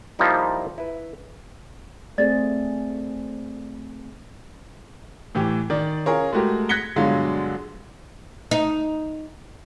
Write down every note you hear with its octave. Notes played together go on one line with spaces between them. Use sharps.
F3 G3 A#3 D#4 E4
E4 B4
A3 C4 G#4 D5 A6
A2 E3 G4
D#3 D5
C#4 F4 G#4 A#4 C#5
G#3 A3 F#4 G4 A#4
F#6 G#6 A#6 B6 C#7 G7
G2 B2 D3 F#3 G#3 F4
D#4